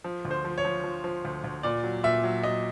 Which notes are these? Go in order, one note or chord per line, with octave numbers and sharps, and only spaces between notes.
F3
D2
C5
F3
C#5
F3
F3
F3
D2
D2
A#2 D5
F#3
A#2 E5
F#3
F#3 D#5